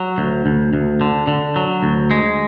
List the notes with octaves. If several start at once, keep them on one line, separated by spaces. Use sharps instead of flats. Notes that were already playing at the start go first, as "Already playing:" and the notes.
Already playing: F#3
D2
D2
D2
D3
D3
F#3
D2
G#3